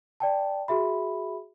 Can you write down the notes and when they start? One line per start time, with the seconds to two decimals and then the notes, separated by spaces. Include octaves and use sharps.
0.20 D5 G5 A5
0.68 F#4 G#4 E5 B5